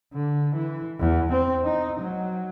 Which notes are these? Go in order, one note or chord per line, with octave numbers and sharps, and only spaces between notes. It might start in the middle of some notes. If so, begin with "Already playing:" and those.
D3
E3
E2
C4
D#4
F#3